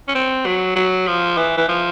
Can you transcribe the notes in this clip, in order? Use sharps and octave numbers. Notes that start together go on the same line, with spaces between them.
C#4
C4
F#3
F#3
F3
E3
E3
F3